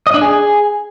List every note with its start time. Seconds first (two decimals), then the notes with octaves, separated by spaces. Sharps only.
0.07 D#5
0.14 D4
0.21 G#4